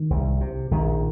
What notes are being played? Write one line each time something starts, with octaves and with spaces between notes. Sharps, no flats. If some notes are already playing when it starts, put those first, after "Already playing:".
Already playing: D#3
C2
C3
A#1 D#3